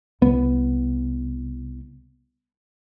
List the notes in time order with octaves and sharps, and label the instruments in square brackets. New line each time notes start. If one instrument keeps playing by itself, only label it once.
[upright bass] C2 [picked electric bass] B3